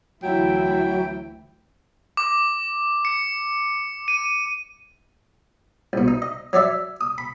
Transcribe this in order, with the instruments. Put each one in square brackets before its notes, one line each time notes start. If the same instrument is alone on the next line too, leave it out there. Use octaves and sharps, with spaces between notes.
[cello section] D2 E3 E4 [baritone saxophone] F#3 [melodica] G5
[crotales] D6
C#7
D#7
[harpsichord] C2 B2
D#4
D#5
F#3 C#5 D5 E5
D#6
B5